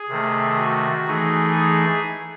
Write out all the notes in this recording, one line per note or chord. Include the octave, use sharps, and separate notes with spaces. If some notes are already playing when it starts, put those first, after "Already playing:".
Already playing: G#4
C3 D#3 A3
F#4
E3 A3 D#4 G#4
G#4